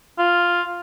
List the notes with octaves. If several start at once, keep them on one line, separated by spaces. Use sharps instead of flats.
F4